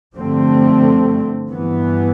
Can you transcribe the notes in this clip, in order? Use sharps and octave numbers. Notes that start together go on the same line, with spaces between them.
G2 D3 F3 A3 C4
G2 E3 B3